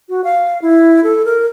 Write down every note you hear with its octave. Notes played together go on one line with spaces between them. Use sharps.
F#4
F5
E4
A4
A#4